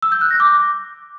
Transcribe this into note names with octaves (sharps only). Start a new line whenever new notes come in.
E6
G6
F#6
A#6
D6